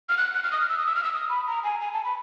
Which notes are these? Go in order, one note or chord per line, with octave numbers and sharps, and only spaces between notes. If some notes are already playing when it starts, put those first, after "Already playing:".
F6
F#6
F#6
F6
D#6
F6
E6
D#6
E6
F6
E6
D#6
B5
A#5
G#5
G#5
A5
B5